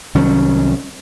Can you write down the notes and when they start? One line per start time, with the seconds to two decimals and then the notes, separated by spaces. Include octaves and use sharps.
0.15 C2 D#3 F#3 C#4